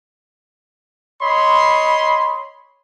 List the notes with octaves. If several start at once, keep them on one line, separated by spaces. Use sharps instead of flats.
C#5 D#5 B5 C6